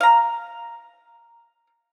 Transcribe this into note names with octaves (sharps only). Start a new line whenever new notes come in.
F5 A#5